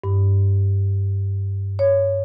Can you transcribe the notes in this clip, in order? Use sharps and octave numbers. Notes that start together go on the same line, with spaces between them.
G2
C#5